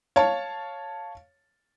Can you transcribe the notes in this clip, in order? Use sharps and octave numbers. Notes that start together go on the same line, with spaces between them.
C#5 F5 A5